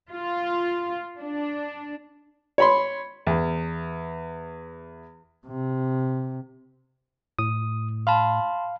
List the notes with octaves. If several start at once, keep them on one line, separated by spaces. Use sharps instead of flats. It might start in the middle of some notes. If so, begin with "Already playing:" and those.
F4
D4
C#5 B5 C6
E2
C3
A2 D#6
F5 A5 B5 C6